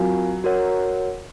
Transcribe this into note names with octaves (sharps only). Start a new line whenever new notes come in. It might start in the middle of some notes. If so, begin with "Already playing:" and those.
Already playing: F#3 C4 F4 A#4 F5 G#5
F#4 A#4 C#5 F#5